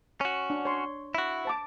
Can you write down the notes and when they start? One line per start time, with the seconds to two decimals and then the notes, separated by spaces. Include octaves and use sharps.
0.21 C#4 F#4
0.50 D4
0.65 C#5 C6
1.15 E4 F#4
1.45 C5 A5 D6